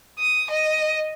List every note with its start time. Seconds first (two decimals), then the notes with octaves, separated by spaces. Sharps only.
0.19 D#6
0.51 D#5